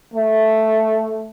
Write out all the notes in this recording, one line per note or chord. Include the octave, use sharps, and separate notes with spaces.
A3